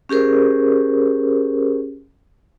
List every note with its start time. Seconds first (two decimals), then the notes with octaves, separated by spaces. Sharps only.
0.09 C#4 G4 G#4 A#4 C5